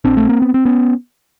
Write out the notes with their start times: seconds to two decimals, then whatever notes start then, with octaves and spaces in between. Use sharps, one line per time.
0.04 A#1 A#2 C4 D4
0.17 A3
0.29 A#3
0.42 B3
0.54 C4
0.65 B3 C#4